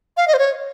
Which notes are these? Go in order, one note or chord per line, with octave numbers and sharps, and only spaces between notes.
F5
D#5
C5
C#5